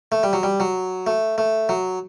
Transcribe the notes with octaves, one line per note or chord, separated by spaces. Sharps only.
A3
G3
F#3
G3
F#3
A3
A3
F#3